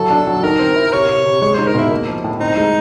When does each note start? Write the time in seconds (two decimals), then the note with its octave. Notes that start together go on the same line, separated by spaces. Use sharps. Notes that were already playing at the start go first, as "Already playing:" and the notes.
Already playing: F#3 E4 A4
0.10 D4
0.27 F#3
0.43 D#3 A#4
0.59 C4
0.76 E4
0.92 C3 C#5
1.09 C3
1.26 C3
1.42 G#3 C#5
1.54 D#4 C5
1.67 A#4
1.74 B2 E4
1.91 A#3
2.07 F3
2.24 A2
2.40 C4 D#4
2.57 G#3